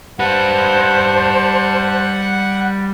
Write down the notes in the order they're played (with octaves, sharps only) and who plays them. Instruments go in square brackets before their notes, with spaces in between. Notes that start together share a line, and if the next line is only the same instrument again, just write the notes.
[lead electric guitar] G3 B4 [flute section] C5 A5 [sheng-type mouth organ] F#5